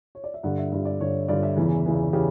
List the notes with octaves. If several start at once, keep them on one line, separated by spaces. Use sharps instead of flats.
C#5
D5
E5
G2 D3 F#5
E5
G2 D3 E5
D5
G2 D3 C#5
G2 D3 D5
E5
E2 C#3 E3
E2 C#3 E3
C#3 E3 G4